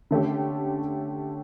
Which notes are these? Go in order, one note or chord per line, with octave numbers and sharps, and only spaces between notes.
D3 A3 C#4 G4